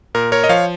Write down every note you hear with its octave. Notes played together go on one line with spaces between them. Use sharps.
A#2 A#4
A#4 C#5
D#5
F3 C#5 F5